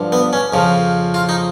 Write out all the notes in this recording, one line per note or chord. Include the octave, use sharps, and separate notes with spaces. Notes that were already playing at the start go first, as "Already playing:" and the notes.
Already playing: G2 D3 F3
B3
C#4
F2 C#3 F3
F4
D#4